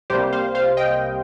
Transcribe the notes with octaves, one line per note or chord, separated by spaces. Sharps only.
C2 C3 G3 A#3 G4 C5
C5 F5
C5 F5
D#5 G5